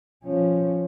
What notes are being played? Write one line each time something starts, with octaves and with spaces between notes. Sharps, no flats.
F3 C#4